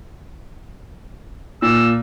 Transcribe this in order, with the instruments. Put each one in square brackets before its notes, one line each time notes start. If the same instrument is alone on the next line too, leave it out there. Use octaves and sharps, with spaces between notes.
[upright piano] A#2 [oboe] E6